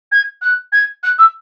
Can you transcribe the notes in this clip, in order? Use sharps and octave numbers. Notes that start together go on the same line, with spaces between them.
G#6
F#6
G#6
F#6
E6